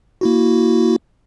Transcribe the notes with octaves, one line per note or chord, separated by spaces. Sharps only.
A#3 E4 F#4